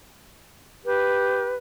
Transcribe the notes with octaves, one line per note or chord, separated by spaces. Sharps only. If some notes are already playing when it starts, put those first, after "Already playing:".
G4 B4